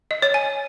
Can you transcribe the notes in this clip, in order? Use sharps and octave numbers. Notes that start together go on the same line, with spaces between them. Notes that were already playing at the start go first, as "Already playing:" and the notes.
D#5
C#5
G#5